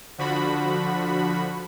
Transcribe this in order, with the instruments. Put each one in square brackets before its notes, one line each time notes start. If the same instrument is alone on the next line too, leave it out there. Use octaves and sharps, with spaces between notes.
[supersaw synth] D3 F3 F#4 B5